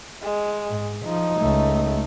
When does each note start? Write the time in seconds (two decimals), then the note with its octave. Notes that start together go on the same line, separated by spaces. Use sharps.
0.22 G#3
0.68 G#2
1.04 F3 D#4
1.40 C#2 A3